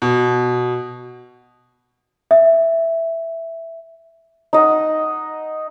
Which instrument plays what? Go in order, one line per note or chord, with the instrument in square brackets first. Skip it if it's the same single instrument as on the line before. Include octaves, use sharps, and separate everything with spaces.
[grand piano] B2
[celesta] E5
[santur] D#4 D#5 F#5